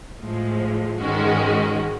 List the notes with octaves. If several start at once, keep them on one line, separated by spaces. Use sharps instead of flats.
A2 F3 G#3
G#2 D#3 G#3 C#4 F#4